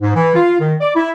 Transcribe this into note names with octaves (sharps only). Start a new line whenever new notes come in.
G#2
E3
F4
D#3
D5
E4